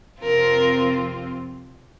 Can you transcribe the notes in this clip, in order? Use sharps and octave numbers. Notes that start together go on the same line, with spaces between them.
F2 C3 F3 C4 F4 A#4